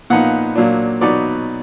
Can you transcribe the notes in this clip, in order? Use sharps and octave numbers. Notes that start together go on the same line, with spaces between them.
A#2 F3 B3 D#4 F#5
A#2 F#3 D4
B2 F#3 B3 D#4 D5